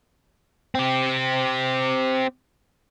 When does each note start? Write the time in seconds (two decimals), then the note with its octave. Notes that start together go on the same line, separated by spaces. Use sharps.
0.75 C4 G4